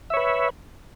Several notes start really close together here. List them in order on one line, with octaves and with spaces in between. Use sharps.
E5 C#5 B4